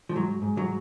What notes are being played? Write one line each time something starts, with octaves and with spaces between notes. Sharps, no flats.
F3
G#2 F#3
G#2
F#3